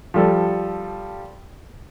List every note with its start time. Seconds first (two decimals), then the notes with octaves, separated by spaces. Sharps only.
0.14 F3 G3 A4